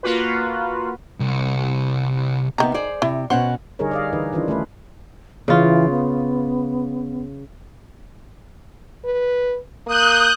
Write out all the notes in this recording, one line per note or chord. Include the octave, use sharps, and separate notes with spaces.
A#3 F4 F#4 B4
C2
C3 D#3 B3 A#5
G#4 C5 D5
C3 E4
B2 C#4 C5 F#5
D3 G3 D#4 G#4 A#4 C#5
D5 D#5 F5
D3 E3 D#4 B4
D#3 E3 C#4 D4 F4
A3 C#4 D#4 E4 B4
C#3 E3 F4
B3
B4
A#3 D#6 F#6 G6